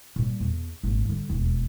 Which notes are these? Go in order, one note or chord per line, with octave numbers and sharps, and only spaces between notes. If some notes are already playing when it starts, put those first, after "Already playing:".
A#2 G3
E2
G#1 A#2
D3 G3
E1 D#2